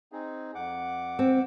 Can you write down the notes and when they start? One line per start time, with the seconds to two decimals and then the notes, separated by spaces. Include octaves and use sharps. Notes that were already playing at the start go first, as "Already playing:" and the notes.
0.12 C4 D#4 G#4
0.55 F2 F#5 D6
1.19 C4